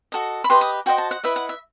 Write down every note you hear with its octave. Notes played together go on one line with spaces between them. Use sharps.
F#4 A4 D#5
B5
G4 B4 D#5 C6
D#6
F#4 C5 D#5 G5
A5
F#5
E4 B4 D#5 E5
F#5
E5